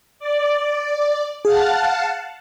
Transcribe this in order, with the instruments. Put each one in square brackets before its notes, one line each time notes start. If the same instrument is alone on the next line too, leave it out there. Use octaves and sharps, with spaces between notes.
[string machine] D5
[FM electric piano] G#4 [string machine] F5 F#5 A5